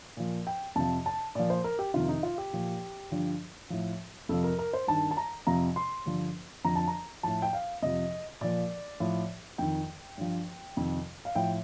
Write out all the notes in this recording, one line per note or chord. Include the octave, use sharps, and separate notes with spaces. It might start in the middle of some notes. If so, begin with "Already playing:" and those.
A#2 F3
G5
F2 C3 F3 A5
A5
A#2 F3 D5
C5
A#4
G4
F2 C3 D#3 F4
D#4
F4
G4
A#2 F3
G2 D3 F3
A2 F3
F2 C3 F3 A4
A#4
A#4
C5
G2 D#3 A5
A5
A#5
F2 C3 F3 A#5
C6
G2 D3 F3
F2 D3 F3 A#5
A5
A#5
A2 F3 A5
G5
F5
F2 C3 F3 D#5
A#2 F3 D5
A2 F3
F2 D#3 G5
G2 F3
F2 C3 D#3
F5
A2 F3 G5